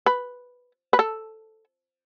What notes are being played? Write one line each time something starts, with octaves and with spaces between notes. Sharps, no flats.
B4
B4
A4